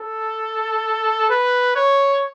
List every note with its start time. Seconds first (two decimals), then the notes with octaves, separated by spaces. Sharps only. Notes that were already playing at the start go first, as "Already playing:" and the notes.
Already playing: A4
1.30 B4
1.76 C#5